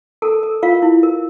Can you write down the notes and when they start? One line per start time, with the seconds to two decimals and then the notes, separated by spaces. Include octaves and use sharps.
0.22 A4 A#4 A5
0.43 A#4
0.62 F4 A#4 F5
0.82 E4
1.03 A#4